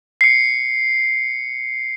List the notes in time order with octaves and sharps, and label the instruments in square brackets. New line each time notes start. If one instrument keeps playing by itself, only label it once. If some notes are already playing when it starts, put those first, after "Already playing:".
[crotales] C7 C#7